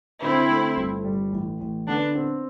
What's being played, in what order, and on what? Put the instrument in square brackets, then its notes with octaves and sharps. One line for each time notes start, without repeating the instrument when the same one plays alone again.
[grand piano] D3 [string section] C4 E4
[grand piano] A3
G1
G3
A1
A1
[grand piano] D3 [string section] B3 D4
[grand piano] C4